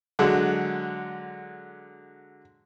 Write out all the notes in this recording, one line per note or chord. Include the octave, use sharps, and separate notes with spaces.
D3 F#3 G#3